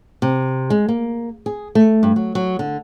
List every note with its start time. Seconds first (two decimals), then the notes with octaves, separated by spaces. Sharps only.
0.22 C3
0.70 G#3
0.88 A#3
1.46 G#4
1.75 A3
2.03 G2
2.16 F#3
2.35 F#3
2.59 D3